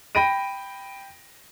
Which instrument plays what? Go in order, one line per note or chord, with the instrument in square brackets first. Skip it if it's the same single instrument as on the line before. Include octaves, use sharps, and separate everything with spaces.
[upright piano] G5 B5 A#6 D7 D#7